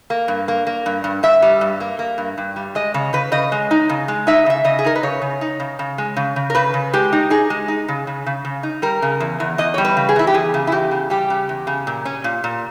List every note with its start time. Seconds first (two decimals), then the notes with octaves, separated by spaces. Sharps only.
0.10 A#3
0.28 G2
0.48 A#3
0.67 A#3
0.86 G2
1.04 G2
1.23 G2 E5
1.42 G3
1.61 G2
1.80 A#3
1.99 A#3
2.18 G2
2.38 G2
2.56 G3
2.75 G#3 D#5
2.94 C#3 C#5
3.13 C#3 B4
3.32 C#3 D#5
3.52 G#3
3.71 D#4
3.89 C#3
4.08 G#3
4.27 D#4 E5
4.46 C#3 E5
4.64 C#3 D#5
4.79 G#4
4.84 D#4 A#4
4.96 B4
5.03 C#3 C#5
5.22 C#3
5.41 D#4
5.60 C#3
5.79 C#3
5.98 G#3
6.16 C#3
6.36 C#3
6.50 A#4
6.55 C#3 B4
6.74 C#3
6.93 G#3 G4
7.12 D#4
7.30 D#4 G#4
7.50 G#3
7.68 D#4
7.88 C#3
8.07 C#3
8.26 C#3
8.45 C#3
8.63 D#4
8.82 G3 A#4
9.02 C#3
9.20 E2
9.40 E2
9.58 E2 D#5
9.74 G3 C#5
9.85 B4
9.97 C#3
10.09 G#4
10.16 E2 E4
10.27 G4
10.34 E2 G#4
10.54 C#3
10.67 E4
10.72 E2 G4
10.91 C#3
11.10 G3 G4
11.30 C#3
11.49 E2
11.67 C#3
11.87 A#2
12.05 C#4
12.24 A#2
12.44 A#2